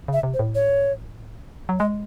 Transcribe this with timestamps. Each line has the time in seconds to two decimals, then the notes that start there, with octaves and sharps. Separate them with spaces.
0.08 C#3 E5
0.23 C3
0.34 C5
0.39 A2
0.55 C#5
1.69 F#3
1.79 G#3 D#5